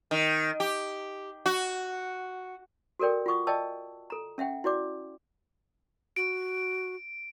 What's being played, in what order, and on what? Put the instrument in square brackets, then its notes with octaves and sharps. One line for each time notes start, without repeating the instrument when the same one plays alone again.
[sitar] D#3
G4
F#4
[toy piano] F#4 A4 A#4 D5 G5
F4 F#5 C#6 D#6
D5 D#5 G5 A5 E6
A4 A#5
C#4 E5 F#5 G5
E4 F#4 D5 D6
[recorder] F#4 [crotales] D7